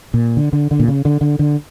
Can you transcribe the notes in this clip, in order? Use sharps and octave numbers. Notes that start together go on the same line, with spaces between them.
A#2
D3
D3
D3
A#2
C#3
D3
D3
D3